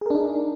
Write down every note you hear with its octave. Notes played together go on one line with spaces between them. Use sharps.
D4 D#4 G#4 A#4